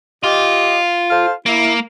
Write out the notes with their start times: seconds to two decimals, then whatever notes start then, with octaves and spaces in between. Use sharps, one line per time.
0.24 F4 G4 D#5
1.10 A4 C5 F5
1.46 A#3 E4